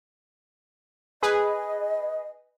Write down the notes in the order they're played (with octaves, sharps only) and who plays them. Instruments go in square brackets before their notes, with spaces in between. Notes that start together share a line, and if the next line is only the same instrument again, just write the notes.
[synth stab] G#4 B4 [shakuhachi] D#5